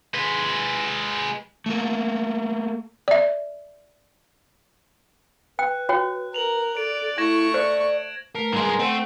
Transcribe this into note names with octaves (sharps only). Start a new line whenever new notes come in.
G#3 B4
A3 A#3
D5 E5
B4 G5 F#6
F#4 C#5 G5
A#4 F7 F#7
A4 D5 D7
A3 E4 C#6 G#6 A#6 E7
C5 D5
A3 A#4 B4
G2 G#3 B4 G#5 C6
A3 C4 F#5 G5